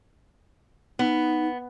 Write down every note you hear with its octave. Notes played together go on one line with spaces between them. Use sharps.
B3 D#4